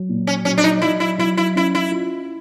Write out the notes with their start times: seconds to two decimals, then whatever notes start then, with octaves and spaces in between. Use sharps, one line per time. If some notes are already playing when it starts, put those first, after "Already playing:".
Already playing: F#3
0.09 A#2
0.27 C#4
0.45 F#3 C#4
0.58 D4
0.64 D#4
0.82 F#3 E4
1.00 E4
1.18 F#3 E4
1.37 E4
1.55 C#4 E4
1.75 E4
1.92 F4